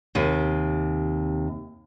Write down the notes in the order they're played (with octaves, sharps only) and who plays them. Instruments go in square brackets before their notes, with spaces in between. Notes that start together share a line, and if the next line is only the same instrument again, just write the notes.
[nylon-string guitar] D#2 C3